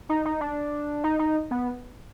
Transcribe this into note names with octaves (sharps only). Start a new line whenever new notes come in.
D#4
D#4
D4
D#4
D#4
B3